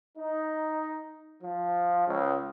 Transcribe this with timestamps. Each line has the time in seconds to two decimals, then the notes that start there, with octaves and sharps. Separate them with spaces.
0.17 D#4
1.43 F3
2.07 C#2